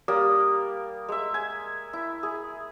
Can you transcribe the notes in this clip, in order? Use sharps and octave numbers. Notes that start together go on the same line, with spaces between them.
G3 A#3 D5 D#6
G#3 E5
G#5
E4
G#4